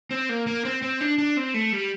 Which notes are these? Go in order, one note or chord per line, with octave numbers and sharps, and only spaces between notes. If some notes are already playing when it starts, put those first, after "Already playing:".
C4
A#3
A#3
C4
C4
D4
D4
C4
A3
G3